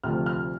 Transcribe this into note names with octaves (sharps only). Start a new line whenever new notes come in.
D2 C3 F3 A3 F6
F6